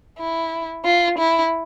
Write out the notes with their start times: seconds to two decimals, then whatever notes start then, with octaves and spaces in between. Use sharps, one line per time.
0.19 E4
0.85 F4
1.19 E4